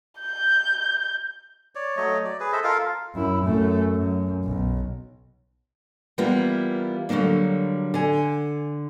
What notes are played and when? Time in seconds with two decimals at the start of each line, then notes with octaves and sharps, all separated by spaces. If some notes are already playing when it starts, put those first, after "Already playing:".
0.20 G6
1.75 C#5 D5
1.97 F#3 A3 C#5 D#5
2.25 D5
2.40 G#4 B4
2.52 A4 C5 D#5 E5
2.64 F4 A4 A#4 F5
3.15 F#2 E4
3.44 F#2 A3
3.95 F#2
4.44 B1
6.18 E3 G3 A#3 B3 E4 F4
7.09 D3 F#3 G3 A#3 D4
7.94 D3 G#5